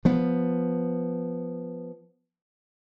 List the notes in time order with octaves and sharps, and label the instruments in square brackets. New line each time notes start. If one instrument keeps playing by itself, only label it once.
[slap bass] F3 B3